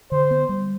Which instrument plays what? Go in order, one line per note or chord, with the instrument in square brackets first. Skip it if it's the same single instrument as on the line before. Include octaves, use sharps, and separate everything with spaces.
[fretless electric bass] D3 [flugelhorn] C5
[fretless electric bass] B3
G3